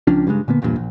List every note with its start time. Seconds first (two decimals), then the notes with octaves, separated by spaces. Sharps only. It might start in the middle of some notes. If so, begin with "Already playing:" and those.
0.07 C#2 F3 C#4 D4
0.27 G2 C#3 G3 G#3
0.48 A#2 D3 A#3 B3
0.62 A#1 E2 G2 A#2
0.76 A#1